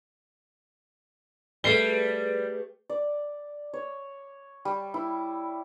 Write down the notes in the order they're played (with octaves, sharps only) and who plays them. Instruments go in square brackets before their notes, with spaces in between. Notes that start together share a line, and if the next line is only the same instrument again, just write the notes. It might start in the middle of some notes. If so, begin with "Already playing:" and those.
[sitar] G3 [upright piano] A3 C7 G7 [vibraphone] G#4 B4
[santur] D5
C#5
G3
E4